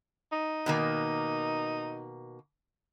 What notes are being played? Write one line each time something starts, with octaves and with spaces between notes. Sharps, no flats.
D#4
B2 D#3 A#3